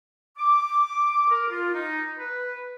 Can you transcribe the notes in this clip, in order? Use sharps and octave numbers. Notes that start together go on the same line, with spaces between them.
D6
A#4
F4
D#4
B4